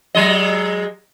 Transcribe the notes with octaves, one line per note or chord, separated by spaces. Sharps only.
F#3 G#3 D#5